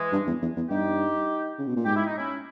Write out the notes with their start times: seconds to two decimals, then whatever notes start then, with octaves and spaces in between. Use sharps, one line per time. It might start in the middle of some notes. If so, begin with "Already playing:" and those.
Already playing: E3 G#3
0.13 G2
0.27 E2
0.42 E2
0.57 E2
0.70 G2 D#4 G4
1.59 C#3
1.67 B2
1.76 A#2
1.85 G#2 G4
1.96 E4
2.06 D#4
2.18 C#4 E4